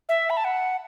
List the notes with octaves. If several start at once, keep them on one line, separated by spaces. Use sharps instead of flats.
E5
B5
A5
F#5